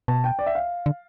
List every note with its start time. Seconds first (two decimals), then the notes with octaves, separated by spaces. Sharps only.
0.08 B2 A5
0.24 G5
0.39 D5
0.46 E5
0.55 F5
0.86 D3